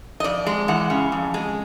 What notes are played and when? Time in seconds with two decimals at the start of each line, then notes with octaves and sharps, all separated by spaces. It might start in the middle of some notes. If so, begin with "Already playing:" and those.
0.20 D#5
0.24 F2 D5
0.46 G#3
0.68 E3 F#5
0.90 C#3
1.12 F2
1.34 G#3